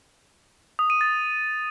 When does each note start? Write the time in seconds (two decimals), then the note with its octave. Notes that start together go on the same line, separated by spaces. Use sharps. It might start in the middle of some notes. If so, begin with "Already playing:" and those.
0.79 D#6
0.90 D#7
1.01 A6